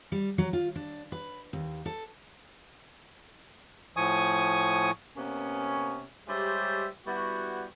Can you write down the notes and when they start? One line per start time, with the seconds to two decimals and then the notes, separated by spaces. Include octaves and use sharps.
0.12 G3
0.38 F#3
0.53 F4
0.76 D4
1.12 B4
1.53 D#2
1.86 A4
3.97 A2 F3 G#5 C#6 D#6
5.16 C3 A#3 B3 C#4
6.27 G3 G#3 G4 C5 C#5 E5
7.06 G3 B3 E4 F#4